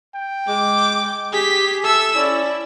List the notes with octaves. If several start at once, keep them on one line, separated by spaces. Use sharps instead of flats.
G5
G#3 D6
G4 G#4 B6
A4 E5 E6
C#4 E4 D5